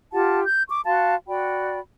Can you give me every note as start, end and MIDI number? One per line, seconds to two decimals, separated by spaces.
0.13 0.42 65
0.13 0.42 67
0.13 0.42 78
0.13 0.42 81
0.45 0.62 91
0.69 0.80 85
0.69 0.80 86
0.85 1.15 66
0.85 1.15 77
0.85 1.15 81
0.85 1.15 84
1.27 1.79 66
1.27 1.79 74
1.27 1.79 79
1.27 1.79 83